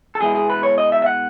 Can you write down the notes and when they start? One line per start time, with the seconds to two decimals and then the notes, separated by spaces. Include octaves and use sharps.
0.15 A4
0.21 B2 G#3 B3 E4 G#4
0.35 G#4
0.50 B4
0.63 C#5
0.78 D#5
0.92 E5
1.02 E5
1.06 F#5